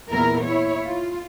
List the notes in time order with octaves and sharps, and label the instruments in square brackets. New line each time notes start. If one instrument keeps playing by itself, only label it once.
[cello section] E2 A#2 E4 A#4
E4 C#5
F4